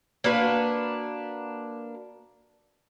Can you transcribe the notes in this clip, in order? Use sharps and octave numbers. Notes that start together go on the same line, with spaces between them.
A#3 D4 F#4 B4